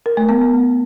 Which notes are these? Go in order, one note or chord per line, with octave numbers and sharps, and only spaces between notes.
A#4
A3
B3